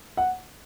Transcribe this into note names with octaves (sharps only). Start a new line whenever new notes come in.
F#5